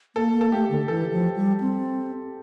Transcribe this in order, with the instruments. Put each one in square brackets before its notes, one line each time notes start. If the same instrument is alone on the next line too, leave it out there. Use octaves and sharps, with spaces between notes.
[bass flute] A#3 [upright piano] A4
[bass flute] A#3
[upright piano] A4
[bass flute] A3 [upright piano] G4
[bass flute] D3
[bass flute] E3 [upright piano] A4
[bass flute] F3
G3
C4